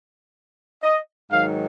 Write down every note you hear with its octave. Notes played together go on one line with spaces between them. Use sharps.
D#5
G#2 D#3 F#3 F5